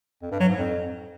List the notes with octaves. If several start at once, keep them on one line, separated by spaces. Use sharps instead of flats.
F2
G2
F#3
G#2
F2